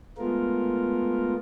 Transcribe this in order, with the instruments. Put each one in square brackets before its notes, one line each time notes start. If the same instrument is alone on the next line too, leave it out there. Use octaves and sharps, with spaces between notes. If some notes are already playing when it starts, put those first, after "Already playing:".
[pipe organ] G#3 A3 B3 F4 A#4